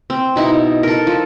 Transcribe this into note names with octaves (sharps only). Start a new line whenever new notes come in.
C4
B2 D#4 E4
A4 A#4
F3